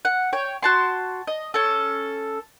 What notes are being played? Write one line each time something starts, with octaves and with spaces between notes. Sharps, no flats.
F#5
C#5 G5
F#4 A5 C6
D#5
C#4 A4